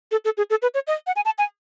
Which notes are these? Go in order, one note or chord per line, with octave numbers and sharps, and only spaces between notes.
A4
A4
G#4
A4
B4
C#5
D#5
F#5
G#5
A5
G#5